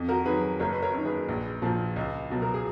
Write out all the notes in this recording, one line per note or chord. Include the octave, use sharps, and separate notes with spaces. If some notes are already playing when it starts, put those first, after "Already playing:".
Already playing: F2
F#4 A#4
D#3 F#3 G#4 B4
F#1 A#4 C#5
B4
A#4 C#5
F#2 D#3
G#4 B4
A#1
A#2 F3
C#2
B2 F#3
A#4
G#4